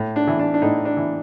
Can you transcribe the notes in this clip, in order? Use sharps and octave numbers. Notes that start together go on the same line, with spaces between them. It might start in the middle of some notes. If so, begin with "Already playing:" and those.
Already playing: A2
D4
E3
D4
D4
A2 D#4
D4
E3